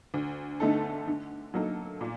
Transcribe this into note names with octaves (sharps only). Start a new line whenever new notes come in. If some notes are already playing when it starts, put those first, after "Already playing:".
D2
D3 A3 D#4 A4
D3
F#3 A#3 D#4 A4
A#2